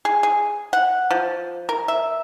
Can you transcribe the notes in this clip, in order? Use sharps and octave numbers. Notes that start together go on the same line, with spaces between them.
G#4
G#4
F#5
F3
A#4
E5